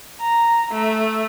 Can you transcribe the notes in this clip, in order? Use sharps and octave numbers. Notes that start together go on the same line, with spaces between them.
A#5
A3